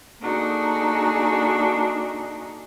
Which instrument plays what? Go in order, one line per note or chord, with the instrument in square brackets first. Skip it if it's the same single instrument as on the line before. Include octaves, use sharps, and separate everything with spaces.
[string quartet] A#3 D4 D#4 F#4 G#4 A4